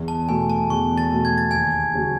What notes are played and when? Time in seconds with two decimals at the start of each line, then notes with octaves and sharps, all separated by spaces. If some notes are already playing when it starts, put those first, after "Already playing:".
Already playing: E2
0.08 A5
0.29 B2 A3 G#5
0.50 A5
0.70 E2 C#6
0.98 A5 A6
1.11 B2 A3
1.25 G#6
1.38 A6
1.51 D#2 G#5 G#6
1.94 C#3 F#3